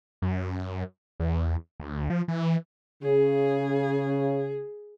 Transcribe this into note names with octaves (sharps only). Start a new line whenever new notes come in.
F#2
E2
D2
F3
E3
C#3 G#4